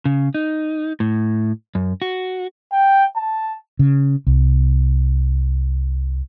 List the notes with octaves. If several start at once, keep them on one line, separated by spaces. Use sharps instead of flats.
C#3
D#4
A2
F#2
F#4
G5
A5
C#3
C2